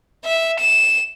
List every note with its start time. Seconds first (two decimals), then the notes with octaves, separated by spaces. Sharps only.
0.25 E5
0.59 E7